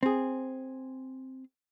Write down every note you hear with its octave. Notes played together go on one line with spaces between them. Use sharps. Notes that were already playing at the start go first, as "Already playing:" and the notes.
C4 G#4